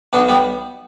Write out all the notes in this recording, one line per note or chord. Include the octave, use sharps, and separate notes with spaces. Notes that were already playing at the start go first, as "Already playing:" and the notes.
B1 B2 B3 D4
G3 B3